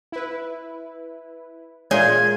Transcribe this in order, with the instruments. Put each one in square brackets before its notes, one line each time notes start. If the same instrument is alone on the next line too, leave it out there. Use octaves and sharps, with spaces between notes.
[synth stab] E4 B4
[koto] A#2 G#4 [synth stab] G#3 F4 [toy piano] C#5 D5 E5 [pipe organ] G#6